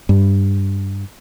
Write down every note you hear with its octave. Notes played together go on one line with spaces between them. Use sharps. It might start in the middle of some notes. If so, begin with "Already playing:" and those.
G2